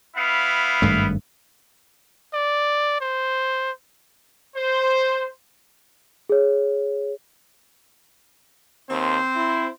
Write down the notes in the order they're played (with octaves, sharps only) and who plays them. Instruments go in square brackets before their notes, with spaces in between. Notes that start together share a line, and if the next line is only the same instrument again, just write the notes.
[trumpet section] B3 E4 F5
[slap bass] G#1 G2 A3
[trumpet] D5
C5
[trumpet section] C5
[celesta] G#4 C#5
[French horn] D#2 [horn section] C4 C5
[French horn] E4